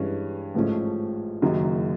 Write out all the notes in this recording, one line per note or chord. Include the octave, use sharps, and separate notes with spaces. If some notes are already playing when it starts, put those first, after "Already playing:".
Already playing: G2 E3 G#3 C#4
A1 G#2 F3 A3 C#4
F#1 F#2 D#3 F#3